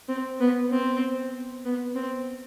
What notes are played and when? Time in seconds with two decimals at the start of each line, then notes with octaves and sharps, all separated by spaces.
0.08 C4
0.40 B3
0.71 C4
1.65 B3
1.96 C4